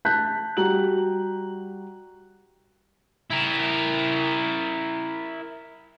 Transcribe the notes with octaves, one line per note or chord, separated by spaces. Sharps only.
A5 F#6 G6 B6
G3 F#4 A#5 F#7
E4 A#4